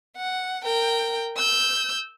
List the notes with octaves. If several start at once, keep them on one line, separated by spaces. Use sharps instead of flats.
F#5
A#4 G5
E6 G6